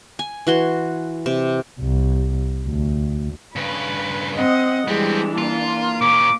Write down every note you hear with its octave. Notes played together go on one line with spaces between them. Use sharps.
G#5
E3 F#4 C6
C3
C2
D2
G2 C#3 B4
C4 D#5 F#5
E3 G3 G#3 B3 C4 D4
A#3 F4
A#2 C#4 D6